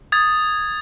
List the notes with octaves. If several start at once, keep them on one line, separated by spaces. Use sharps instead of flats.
D#6 G#6 A6